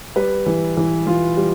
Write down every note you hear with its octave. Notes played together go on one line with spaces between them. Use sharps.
G3 B4
E3
E3
E3 F4
G3